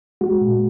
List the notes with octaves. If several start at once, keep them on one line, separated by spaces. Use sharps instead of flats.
G#3 F#4
A#2